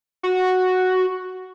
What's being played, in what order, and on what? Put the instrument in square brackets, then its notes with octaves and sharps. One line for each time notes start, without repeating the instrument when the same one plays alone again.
[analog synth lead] F#4